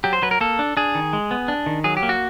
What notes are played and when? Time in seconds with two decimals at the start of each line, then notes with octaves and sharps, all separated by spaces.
0.04 F#3 G4
0.13 C5
0.22 F#3 B4
0.31 A#4
0.41 A#3 A4
0.59 D4
0.77 D4 G#4
0.95 D#3
1.13 G#3
1.31 B3
1.48 D4
1.66 D#3
1.84 F#3 G#4
1.97 G4
2.03 A#3
2.09 F#4